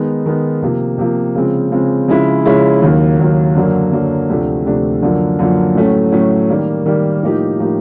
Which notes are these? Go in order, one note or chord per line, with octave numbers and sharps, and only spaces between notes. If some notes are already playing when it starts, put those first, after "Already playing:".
Already playing: D#3 G#3 B3 D#4
D#3 G#3 B3 D#4
C3 F3 A#3
C3 F3 A#3
C#3 F3 G#3 C4
C#3 F3 G#3 C4
C#3 F3 G#3 C#4 E4
C#3 F3 G#3 C#4 E4
D#2 D#3 F#3 A#3
D#2 D#3 F#3 A#3
F#2 D3 F#3 A#3
F#2 D3 F#3 A#3
D2 C3 F3 A3 D4
D2 C3 F3 A3 D4
F#2 D3 F3 A#3
F#2 D3 F3 A#3
A2 F#3 A3 C#4
A2 F#3 A3 C#4
D#3 G3 A#3
D#3 G3 A#3
A2 F3 A#3 D#4 G4
A2 F3 A#3 D#4 G4